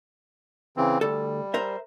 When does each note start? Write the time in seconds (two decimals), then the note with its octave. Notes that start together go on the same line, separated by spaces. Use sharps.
0.77 C#3 E3 C4
1.01 D2 G3 A4
1.54 A#4 C5 E5